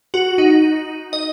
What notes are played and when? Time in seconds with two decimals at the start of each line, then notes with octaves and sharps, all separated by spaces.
0.14 F#4
0.38 D#4
1.13 D#5